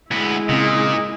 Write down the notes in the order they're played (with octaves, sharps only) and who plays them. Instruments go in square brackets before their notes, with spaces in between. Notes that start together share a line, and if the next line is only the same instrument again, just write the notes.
[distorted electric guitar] D2 B3 [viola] G#3 E4
[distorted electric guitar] A#2 [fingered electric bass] C#3 C4 [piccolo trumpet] D#5